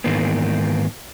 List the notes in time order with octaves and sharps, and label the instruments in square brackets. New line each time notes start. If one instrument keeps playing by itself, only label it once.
[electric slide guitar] G#2 D#3 E3 A#3 B3